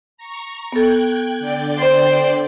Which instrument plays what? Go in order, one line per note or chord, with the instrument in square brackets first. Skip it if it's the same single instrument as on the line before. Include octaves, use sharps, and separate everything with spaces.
[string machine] A#5 C#6
[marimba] B3 A4 [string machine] G5 F#6 G#6
[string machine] D3 D5 G5
[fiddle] C5